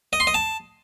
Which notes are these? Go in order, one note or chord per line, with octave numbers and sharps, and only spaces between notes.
D#5
C6
D#5
A5